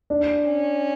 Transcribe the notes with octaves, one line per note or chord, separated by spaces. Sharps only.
D4
C#4